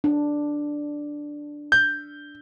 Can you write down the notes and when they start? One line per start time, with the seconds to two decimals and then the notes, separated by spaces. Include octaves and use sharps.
0.04 D4
1.72 G6